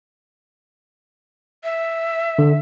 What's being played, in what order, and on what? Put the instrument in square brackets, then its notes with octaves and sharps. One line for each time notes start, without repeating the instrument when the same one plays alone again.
[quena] E5
[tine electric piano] D3